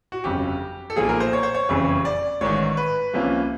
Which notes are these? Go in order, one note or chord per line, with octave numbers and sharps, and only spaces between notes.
F#4
G1 F2 C#3 F#3 G4
A4
B1 A#2 F3 A#3 G#4
A#4
C5
C#5
C5
C#5
F#1 F2 C#3 E3 G3
D5
A1 G#2 D#3 C#5
B4
C2 C3 F3 A#3 C#4